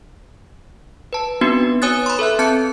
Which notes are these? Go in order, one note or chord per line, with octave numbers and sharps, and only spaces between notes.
B4 A5
B3 C4 D4 D#4 F#4 B4
B4 C#5 G#5 D#6 F#6 A6
B5 C6
A4 B4 E5 F#6
C4 A5 G6 C#7